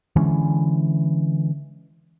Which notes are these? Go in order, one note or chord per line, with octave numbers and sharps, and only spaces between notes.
D3 E3 G#3 C#4